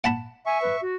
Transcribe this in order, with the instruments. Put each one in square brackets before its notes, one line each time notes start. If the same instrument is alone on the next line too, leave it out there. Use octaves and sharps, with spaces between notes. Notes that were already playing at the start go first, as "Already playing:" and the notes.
[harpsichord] F#5 A5 B5
[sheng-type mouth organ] E5 C#6 [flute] G#5
[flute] B4
F#4